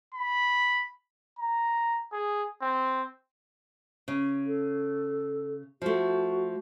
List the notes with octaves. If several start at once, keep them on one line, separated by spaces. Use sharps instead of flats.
B5
A#5
G#4
C4
C#3
A4
F3 A3 F#4